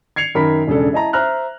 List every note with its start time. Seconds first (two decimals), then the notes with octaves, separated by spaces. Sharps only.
0.16 G#6 C7 C#7 F7
0.35 F#2 D#3 A#4 B5 B6
0.67 E1 C#3 D4 A4
0.93 E4 D#5 A5 A#5
1.13 C5 E5 A#5 F6 F#6